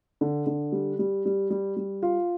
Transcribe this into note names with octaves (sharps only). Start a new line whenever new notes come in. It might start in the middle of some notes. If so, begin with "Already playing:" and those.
D3
D3
G3
G3
G3
G3
G3
F4